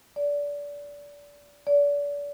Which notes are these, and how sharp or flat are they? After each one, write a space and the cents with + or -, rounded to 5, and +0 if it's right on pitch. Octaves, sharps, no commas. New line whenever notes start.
D5 -25
D5 -35